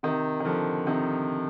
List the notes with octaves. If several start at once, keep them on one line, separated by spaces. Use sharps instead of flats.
C3 D#3
D#3
D3 F3
C3 D#3